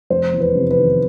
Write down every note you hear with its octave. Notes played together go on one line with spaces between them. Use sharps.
F1 C5
E2
B4
C3
B4
D#3